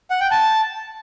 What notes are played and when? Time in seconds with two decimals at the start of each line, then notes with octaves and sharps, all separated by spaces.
0.10 F#5
0.21 G5
0.31 A5